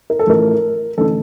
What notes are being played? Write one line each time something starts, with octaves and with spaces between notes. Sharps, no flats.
A#4
A4
A1 A2 F3 A#4
A1 D3 A4